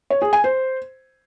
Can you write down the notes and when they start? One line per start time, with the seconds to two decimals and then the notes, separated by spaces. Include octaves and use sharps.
0.10 C#5
0.22 G#4
0.33 G#5
0.44 C5